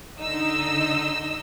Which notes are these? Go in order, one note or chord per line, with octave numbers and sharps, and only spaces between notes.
D3 D#4 D#5 E6